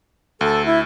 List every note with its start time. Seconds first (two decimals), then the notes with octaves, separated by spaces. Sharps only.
0.41 D2 A4
0.66 E4